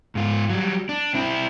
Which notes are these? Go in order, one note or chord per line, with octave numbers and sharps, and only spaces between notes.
G#2 F4
F#3 G3
D4
C4 E4